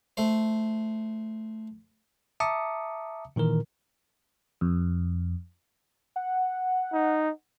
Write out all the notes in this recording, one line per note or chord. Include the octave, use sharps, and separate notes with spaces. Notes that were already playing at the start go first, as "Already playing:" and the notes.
A3 C5
E5 A5 A#5 D6 D#6 C#7
A#2 D#3 E3 A#4
F2
F#5
D#4